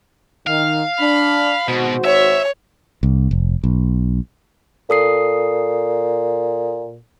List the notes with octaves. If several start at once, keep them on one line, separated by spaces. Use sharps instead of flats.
D#3 F5
D4 B5
G#1 B2 F#4 C5
C#5 E5
C2
F1
B1
A#2 A4 D#6 C7